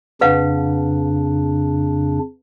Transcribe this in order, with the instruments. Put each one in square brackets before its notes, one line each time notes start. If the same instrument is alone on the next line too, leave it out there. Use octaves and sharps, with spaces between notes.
[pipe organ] F2 C#3 D4 [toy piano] B4 F5 F#5